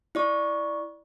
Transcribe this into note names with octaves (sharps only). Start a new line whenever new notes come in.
E4 D5 C#6